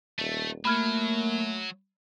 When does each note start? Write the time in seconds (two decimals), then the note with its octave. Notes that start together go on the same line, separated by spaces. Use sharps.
0.19 D#1 A3
0.65 F#3 A3 A#3 B5 F6 G#6